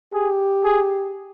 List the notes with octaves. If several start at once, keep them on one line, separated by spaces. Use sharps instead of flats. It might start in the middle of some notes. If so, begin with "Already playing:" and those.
G4 G#4
G#4